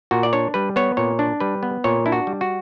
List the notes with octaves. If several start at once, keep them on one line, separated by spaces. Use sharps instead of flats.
A#2 F#4
D5
D4 C#5
G3 B4
B3 C#5
A#2 C#5
D4
G3 B4
B3
A#2 C#5
D4 E4
F#4
G3
F#4